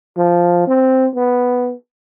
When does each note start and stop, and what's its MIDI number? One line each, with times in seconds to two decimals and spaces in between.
0.17 0.66 53
0.67 1.07 60
1.16 1.74 59